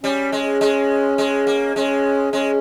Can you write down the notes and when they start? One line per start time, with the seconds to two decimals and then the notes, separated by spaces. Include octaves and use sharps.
0.03 G3 C#4
0.32 G#3
0.61 G#3
1.18 G#3
1.47 A#3
1.76 G#3 C#4
2.33 G#3 C#4